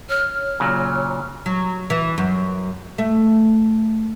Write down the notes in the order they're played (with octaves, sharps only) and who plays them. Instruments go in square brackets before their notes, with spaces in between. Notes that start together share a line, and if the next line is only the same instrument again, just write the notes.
[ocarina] C#5 [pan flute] F6
[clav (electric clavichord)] A#2 C#3 F#3
[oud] F#3
E3
F#2
A3